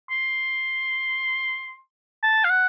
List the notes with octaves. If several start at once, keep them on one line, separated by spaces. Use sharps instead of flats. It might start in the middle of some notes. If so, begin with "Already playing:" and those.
C6
A5
F5
F#5